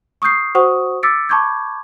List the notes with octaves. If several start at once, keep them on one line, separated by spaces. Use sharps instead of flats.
C#6 D#6 F6 G6 C7
F#4 C5 F#5 C#6 D#6
D6 E6 A6 B6 C#7 D7
A5 B5 C#6 D6 G6 G#6